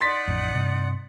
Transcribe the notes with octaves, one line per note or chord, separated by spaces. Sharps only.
D#4 D5 F#5 C6 A6 B6
A1 F2
G2 C3